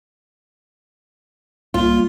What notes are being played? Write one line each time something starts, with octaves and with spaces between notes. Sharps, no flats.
C2 G3 A#3 F4